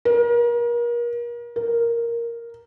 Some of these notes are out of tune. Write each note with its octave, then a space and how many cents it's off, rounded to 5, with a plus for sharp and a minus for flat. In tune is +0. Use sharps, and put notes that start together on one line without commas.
A#4 +35
A#4 +0